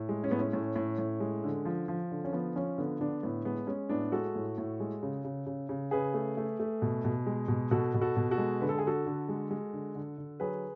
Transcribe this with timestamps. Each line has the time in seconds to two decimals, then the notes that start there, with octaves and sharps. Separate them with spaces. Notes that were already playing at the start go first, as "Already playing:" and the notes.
Already playing: A2
0.09 G#3
0.24 C#4
0.31 A2 B3
0.40 C#4
0.53 A2
0.76 A2
0.98 A2
1.20 G#3
1.44 D3
1.65 F3
1.88 F3
2.11 D3
2.24 C#4
2.32 F3 B3
2.55 F3 C#4
2.78 D3 B3
3.00 D3 B3 D4
3.23 A2 B3
3.45 G#3 B3
3.67 G#3 C#4
3.89 A2 B3 D4
4.12 G#3 F#4 A4
4.35 A2
4.58 A2
4.80 G#3
5.03 C#3
5.24 C#3
5.46 C#3
5.69 C#3
5.91 C#3 G#4 B4
6.14 A3
6.37 A3
6.60 A3
6.82 B2
7.05 B2
7.26 G#3
7.48 B2
7.71 B2 F#4 A4
7.94 B2
8.01 F#4 A4
8.17 B2
8.31 F#4 A4
8.38 G#3
8.61 D3 B4
8.69 A4
8.78 G#4
8.84 D3 F#4 A4
9.06 D3
9.29 G#3
9.51 G#3
9.73 D3
9.95 D3
10.18 D3
10.40 F#3 G#4 B4